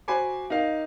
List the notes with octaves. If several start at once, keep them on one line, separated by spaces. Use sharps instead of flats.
F#4 C5 F#5 G#5 B5 D6
D#4 A#4 F5